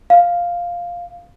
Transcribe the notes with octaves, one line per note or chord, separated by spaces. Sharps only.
F5